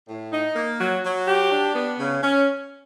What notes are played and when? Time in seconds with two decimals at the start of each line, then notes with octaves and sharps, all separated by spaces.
0.09 A2
0.33 D#4
0.56 A#3
0.80 F#3
1.03 F#3
1.27 G4
1.51 D4
1.75 B3
1.98 C#3
2.22 C#4